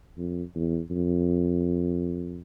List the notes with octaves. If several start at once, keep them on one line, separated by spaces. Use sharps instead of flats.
F2
E2
F2